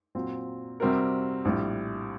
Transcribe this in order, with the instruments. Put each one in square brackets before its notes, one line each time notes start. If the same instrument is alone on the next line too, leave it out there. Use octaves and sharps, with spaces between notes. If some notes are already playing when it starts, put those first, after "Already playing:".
[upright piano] A#2 F#3 C4
C3 G3 C4 F#4 A#4
A#1 A2 G3